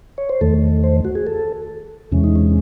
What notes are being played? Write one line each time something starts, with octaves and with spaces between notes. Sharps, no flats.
C#5
C5
E2 D#3 A3 A4
C5
F#4
G#4
A4
E2 C3 E3 G#3 C#4
D#4
C#4